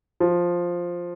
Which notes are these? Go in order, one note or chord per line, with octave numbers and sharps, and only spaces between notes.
F3